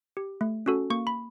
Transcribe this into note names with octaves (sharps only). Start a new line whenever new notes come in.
G4
A3
C#4 F#4 A4
A#3 C#6
B5